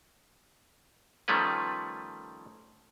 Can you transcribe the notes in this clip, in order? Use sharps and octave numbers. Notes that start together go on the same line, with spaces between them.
D#3 F3 G3 A3 C#4 B4